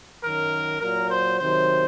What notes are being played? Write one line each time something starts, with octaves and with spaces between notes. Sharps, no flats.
F#2 D#3 F#3 A#4
A#2 F#3 A#4
C5
C3 D#3 F#3 C5